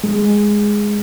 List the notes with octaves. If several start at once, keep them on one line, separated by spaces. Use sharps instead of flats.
G#3